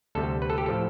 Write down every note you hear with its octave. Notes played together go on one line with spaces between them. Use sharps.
D2 C3 G3 A4
B4
A4
G4
A2 F3 A4